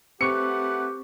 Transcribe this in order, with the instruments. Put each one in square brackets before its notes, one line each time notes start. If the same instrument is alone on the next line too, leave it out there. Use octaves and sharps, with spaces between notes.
[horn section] A3 B4 F#5 [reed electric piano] C4 C#6 [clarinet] G4 [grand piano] C#7